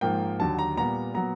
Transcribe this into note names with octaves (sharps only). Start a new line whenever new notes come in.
G#2 F3 A#3 G5
D#2 D3 F#3 A5
A#5
A#2 G3 B3 A#5
A#2 F#3 B3 A#5